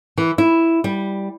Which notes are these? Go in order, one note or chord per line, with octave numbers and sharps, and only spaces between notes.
E3
E4
G3